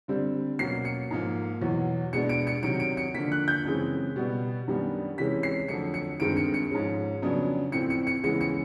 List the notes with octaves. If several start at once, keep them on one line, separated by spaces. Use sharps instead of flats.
D3 G3 C4
B2 F#3 A#3 C#4 C7
C#7
G#2 F3 A#3
E2 B2 F#3
B2 G#3 B3 D4 C#7
D7
C#7
C3 D#3 F#3 D7
D7
C#7
D3 F3 A#3 B6
F#6
G6
F#2 C#3 E3 G#3 C4
B2 G3 B3
F#2 D#3 G3 B3 D4
C3 E3 G#3 C#4 B6
C7
F2 D3 F#3 A3 C#7
C#7
G2 D#3 G#3 C4 D7
C#7
C#7
G#2 F3 G#3 C#4
F2 C#3 F#3 B3 D4
A2 F3 A3 C4 C#7
C#7
C#7
C#3 E3 G#3 B3 C#7
C#7